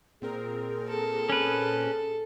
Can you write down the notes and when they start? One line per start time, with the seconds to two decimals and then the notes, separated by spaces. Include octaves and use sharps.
0.22 A#2 C4 G#4 A#4
0.88 A4
1.30 C#4 B4